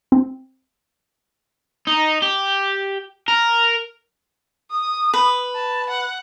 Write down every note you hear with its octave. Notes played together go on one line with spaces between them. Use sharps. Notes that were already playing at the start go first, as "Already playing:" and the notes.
C4
D#4
G4
A#4
D#6
B4
A5
F#5